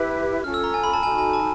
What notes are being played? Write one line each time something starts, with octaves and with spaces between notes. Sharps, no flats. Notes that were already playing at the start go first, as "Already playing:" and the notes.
Already playing: E4 G4 B4 E5
C#4 F4 A4 F6
E6
A#5
G#5
B5
A5
D#4 F#4 A4 G#5
G#5
A5